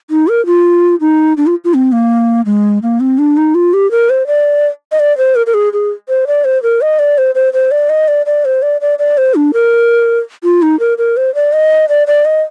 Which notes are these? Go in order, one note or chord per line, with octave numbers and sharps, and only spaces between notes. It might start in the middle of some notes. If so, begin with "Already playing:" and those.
D#4
A#4
F4
D#4
D4
F4
F4
C4
A#3
G#3
A#3
C4
D4
D#4
F4
G4
A#4
C5
D5
D#5
D5
C5
A#4
A#4
G#4
G#4
C5
D5
C5
A#4
D#5
D5
C5
C5
C5
D5
D#5
D5
D5
C5
D5
D5
D5
C5
D4
A#4
F4
D#4
A#4
A#4
C5
D5
D#5
D5
D5
D#5